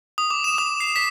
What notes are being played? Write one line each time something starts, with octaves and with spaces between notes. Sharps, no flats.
D#6
D6
E7
D#6
C7
B6